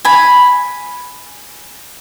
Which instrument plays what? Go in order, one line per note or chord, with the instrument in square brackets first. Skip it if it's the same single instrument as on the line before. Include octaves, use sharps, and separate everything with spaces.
[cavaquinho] G#5 B5